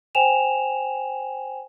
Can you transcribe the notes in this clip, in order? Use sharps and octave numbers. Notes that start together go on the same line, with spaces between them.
C5 G5 G#5 E7 F7